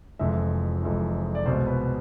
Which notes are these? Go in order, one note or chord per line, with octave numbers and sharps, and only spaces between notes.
F1 F2 E3 G#3 E5
F1 F2 E3 G#3
D5
C2 B2 G#3 C5
B4